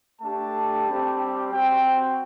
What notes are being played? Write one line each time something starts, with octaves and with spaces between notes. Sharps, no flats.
A3 D4 G4 A5
G3 C4 G4
C4 F#4 G5